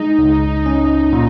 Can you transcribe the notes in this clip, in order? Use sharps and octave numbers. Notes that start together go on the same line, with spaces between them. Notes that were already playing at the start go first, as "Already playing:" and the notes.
Already playing: G#3 D#4
C#2
C#4
A#2